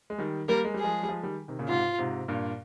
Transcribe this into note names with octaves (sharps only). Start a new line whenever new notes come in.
G#3
D#3 G3
G3 A#3 A#4
G#3
G3 G#4
F3 G#3
G3
F3 G#3
D#3 G3
C3 D#3
A#2 C#3
G#2 C3 F4
G#2 C3
G2 A#2